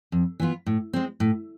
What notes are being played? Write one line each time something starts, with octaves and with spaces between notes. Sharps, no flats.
F2
E3 B3 F4
A2
G#3 C4
A2